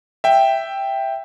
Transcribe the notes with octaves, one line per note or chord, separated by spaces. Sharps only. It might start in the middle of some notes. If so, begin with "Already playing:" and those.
E5 G5